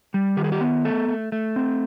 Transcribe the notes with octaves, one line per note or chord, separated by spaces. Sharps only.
G3
D#3 G4
G#4
G4
B3
A3 A4
A3
A3
C4